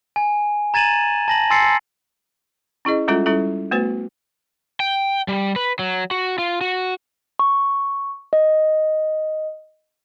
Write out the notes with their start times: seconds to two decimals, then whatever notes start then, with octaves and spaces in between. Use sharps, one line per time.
0.16 G#5
0.74 A#5 G#6 A6 D#7 E7 F#7
1.28 A5 A#6 F#7
1.50 G#5 C6 E6 A6 C7 C#7
2.85 C#4 E4 G#4 D#5
3.08 G3 G#3 C#4 F4 A4
3.26 G3 C#4 E4 A4
3.71 A3 B3 F#4 B4 C5
4.80 G5
5.28 G3
5.56 B4
5.79 F#3
6.11 F#4
6.38 F4
6.61 F#4
7.39 C#6
8.33 D#5